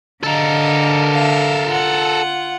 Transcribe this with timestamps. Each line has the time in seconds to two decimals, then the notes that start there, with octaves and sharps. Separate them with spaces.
0.24 D3 A4 A#4 D#5 F5
1.14 E5 F5
1.68 F4 F#5